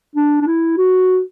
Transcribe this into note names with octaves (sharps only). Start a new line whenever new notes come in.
D4
D4
E4
F#4